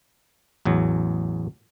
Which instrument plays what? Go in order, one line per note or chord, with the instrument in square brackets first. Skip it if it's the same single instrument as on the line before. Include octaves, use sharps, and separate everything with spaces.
[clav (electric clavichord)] A1 E2 F#3